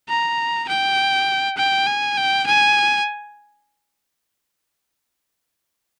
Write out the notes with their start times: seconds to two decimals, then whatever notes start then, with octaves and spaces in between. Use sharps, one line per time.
0.09 A#5
0.69 G5
1.57 G5
1.87 G#5
2.17 G5
2.46 G#5